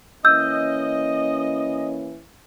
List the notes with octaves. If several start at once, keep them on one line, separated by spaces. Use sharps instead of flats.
E3 A#3 C#4 D#5 E6 G6